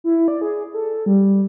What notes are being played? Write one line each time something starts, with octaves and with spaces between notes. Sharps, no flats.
E4
D5
G#4
A4
G3